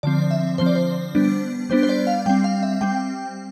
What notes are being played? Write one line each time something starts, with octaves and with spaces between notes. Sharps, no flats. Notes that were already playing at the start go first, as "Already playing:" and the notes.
D3 F3 C4 D5
E5
D3 F3 C4 C5
D5
C5
G3 B3 D4
G3 B3 D4 C5
C5
D5
F5
G3 C4 G5
F5
E5
G3 C4 G5